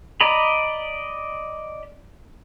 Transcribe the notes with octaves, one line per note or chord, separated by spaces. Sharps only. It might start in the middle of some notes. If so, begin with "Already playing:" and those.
D5 D#5 A#5 B5